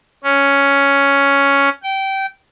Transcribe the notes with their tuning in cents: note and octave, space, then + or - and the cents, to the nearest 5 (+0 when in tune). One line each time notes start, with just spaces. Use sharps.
C#4 +5
G5 -20